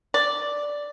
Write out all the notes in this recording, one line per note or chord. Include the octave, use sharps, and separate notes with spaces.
D5